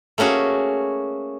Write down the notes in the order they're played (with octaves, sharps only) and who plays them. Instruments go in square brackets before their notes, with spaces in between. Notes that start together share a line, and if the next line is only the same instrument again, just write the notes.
[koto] A3 A#3 C#4 F#4 G#4